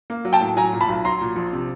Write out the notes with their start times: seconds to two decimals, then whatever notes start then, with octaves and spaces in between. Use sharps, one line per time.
0.10 A#3
0.25 F#3
0.33 G5 A5
0.41 A2
0.57 F#3 G#5 A#5
0.73 A#2
0.81 A5 B5
0.89 B1
1.05 F#3 A#5 C6
1.21 A#2
1.36 A#1
1.53 C3